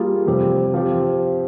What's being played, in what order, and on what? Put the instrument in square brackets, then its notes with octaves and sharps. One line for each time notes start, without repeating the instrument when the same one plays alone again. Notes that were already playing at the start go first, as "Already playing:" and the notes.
Already playing: [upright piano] G3 A#3 F4 G#4
F2 C3 G3 C4 G4
F3 C4 G4